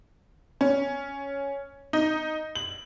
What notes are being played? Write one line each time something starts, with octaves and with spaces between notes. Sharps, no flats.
C#4
D#4
F#7